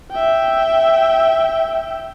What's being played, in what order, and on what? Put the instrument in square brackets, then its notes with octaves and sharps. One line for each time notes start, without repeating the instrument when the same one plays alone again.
[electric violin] E5 G5